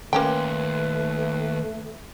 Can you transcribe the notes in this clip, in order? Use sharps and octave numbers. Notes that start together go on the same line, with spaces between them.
D#2 A3 A#3 C#4 B4 G5 C6